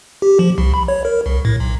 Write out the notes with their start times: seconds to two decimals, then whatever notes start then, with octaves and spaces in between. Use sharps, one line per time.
0.22 G4
0.39 F3
0.58 C2
0.74 B5
0.88 C#5
1.05 A#4
1.26 C2
1.45 A2
1.60 B1